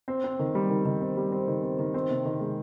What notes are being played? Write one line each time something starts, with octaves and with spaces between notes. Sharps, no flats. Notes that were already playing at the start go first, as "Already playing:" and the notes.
C4
C4
D#3
G3
D#3
D#3
C4
G3
C4
D#3
C4
D#3
C4
C3
D#3
G#3